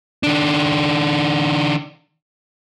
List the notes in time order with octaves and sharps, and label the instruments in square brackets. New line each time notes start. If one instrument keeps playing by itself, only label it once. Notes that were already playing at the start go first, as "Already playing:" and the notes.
[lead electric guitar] D#3 D4